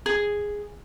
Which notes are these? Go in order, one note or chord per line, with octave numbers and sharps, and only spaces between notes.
G#4